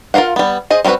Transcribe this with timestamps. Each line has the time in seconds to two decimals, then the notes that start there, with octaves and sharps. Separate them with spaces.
0.14 F4 A#4 C5 F5 F#5
0.36 G3 B3
0.70 G#4 C5 D#5
0.84 G3 C4 C#4 F#4 B4